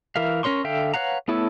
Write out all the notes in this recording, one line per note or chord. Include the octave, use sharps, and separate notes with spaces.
E3 A#4 E5 F5
C#4 A#4 C#5 C6 C#6
D3 A4 E5 F5 G5
B4 C#5 F5 F#5 A#5
A3 B3 E4 A4 C#5